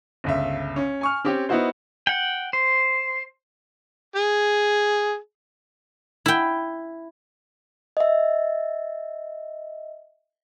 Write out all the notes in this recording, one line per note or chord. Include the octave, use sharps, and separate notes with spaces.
G1 C#2 E5
C#4
G#5 C#6 F6
C4 C#4 G4
B3 D#4 E4 F#4 C5
F#5 G5
C5
G#4
E4 G5
D#5 E5